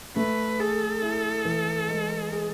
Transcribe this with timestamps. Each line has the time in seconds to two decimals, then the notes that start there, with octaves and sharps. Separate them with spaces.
0.16 A3 B4
0.59 G#4 A4
1.02 E4
1.45 E3
1.88 G#3
2.32 G#4